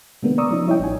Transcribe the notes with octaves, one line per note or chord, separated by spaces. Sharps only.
C3 D#3 G#3 A#3 B3 D4
D5 A#5 C#6 D#6 E6
F3 C#4 D#4
G3 E4 C#5 D#5 G5
A1 G#5